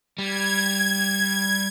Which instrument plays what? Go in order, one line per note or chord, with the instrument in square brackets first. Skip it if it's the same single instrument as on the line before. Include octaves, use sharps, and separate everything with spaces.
[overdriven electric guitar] G3 [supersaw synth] G#6